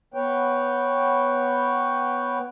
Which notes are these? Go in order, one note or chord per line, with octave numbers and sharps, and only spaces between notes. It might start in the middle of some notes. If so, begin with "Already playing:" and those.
B3 B4 C#5 G5